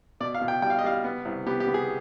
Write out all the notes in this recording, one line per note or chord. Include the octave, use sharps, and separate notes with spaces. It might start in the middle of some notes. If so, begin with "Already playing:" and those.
B2 D5
F5
B2
G5
G3 G5
F5
D#5
G3 F5
B3
C2
B3 G4
G4
B3
G#4